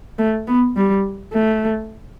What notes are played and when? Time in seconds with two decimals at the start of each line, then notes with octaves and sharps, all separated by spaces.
0.19 A3
0.47 B3
0.76 G3
1.33 A3